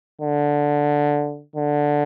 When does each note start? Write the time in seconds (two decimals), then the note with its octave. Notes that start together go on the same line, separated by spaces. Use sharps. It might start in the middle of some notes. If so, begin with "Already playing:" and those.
0.22 D3
1.56 D3